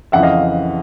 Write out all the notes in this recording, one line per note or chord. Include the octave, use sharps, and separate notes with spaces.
F2 C#3 E3 E5 F#5
D#5 F5